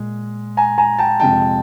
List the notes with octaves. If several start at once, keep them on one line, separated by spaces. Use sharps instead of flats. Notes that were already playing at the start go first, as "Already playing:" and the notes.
Already playing: A#2 G#3
G#5 A#5
G#5 A#5
G5 A5
F2 C3 F3 G#3 G5 A5